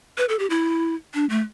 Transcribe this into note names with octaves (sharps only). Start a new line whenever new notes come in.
B4
A4
G4
E4
D4
A3